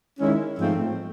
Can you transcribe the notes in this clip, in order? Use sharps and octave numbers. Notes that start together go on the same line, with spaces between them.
D#3 G#3 C#4 E4
G#2 F3 A3 C4